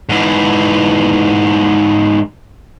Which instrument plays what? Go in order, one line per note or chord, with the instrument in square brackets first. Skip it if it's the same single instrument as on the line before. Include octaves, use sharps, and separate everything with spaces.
[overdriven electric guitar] G#2 E3